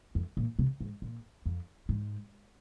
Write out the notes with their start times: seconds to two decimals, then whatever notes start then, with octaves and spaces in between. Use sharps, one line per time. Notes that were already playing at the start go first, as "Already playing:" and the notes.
0.15 F2
0.37 A#2
0.59 C3
0.81 G#2
1.02 A#2
1.46 F2
1.89 G#2